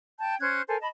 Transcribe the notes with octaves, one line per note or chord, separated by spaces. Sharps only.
G5 A5 G6
C#4 C5 F#6 G#6
A4 A#4 C5 G#5
D#5 A5 B5